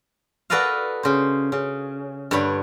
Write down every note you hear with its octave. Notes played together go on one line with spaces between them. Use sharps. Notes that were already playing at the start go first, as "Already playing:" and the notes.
F#4 A4 B4 D5 D#5 F5
C#3 C5
C#3
G2 D3 C#5 B5